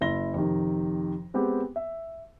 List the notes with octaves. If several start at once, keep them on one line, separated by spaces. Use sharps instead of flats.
F#1 E4 E5 C6 A#6 G7
F2 C3 D#3
G#3 B3 C4 G4
E5